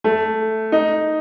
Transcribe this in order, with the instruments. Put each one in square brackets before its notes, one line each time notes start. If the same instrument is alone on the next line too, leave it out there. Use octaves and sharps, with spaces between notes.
[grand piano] A3
D#4